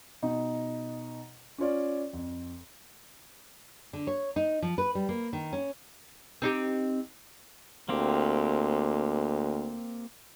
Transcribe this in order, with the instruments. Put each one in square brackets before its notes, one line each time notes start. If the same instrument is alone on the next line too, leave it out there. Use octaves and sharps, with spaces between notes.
[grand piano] B2 D#4
C#4 F4 C#5 D5
F2
[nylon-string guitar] D3
C#5
D#4
F3
B4
G3
A#3
D#3
C#4
[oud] C4 D#4 G4
[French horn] D2 [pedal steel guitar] A#3 C4 G4